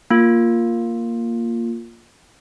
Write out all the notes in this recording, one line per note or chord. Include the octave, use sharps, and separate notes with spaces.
A#3 F4